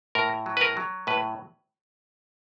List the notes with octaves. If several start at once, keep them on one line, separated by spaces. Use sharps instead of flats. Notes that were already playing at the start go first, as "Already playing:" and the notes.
A2 A#4
F#3
B4
A#4
F#3
A2 B4